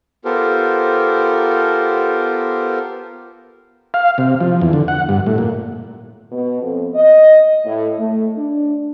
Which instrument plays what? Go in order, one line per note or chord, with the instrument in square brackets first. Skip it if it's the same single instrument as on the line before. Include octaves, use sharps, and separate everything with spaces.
[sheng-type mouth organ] B3 F4 G4 A4 A#4 C5
[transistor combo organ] F5
C3
F3
E2
D3
F#5
G2
A2
A#2
[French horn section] B2
F2
D#5
A2
A3
D4